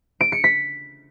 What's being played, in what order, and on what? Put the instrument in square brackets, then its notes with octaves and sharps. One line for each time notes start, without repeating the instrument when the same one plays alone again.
[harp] D7
C#7
B6